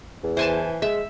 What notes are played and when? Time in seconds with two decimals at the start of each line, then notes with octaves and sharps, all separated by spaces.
0.24 E2
0.37 E3 C5 G#5 A5
0.82 G#3 E5